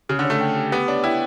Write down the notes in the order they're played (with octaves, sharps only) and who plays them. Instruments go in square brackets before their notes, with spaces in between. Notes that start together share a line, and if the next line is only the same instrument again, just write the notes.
[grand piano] C#3 [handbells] G4
[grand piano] D3
[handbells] C#5
[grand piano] A3
[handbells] G5
G4
[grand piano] B3 [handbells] G4
[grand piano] D4 [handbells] C#5
[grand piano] E4 [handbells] G5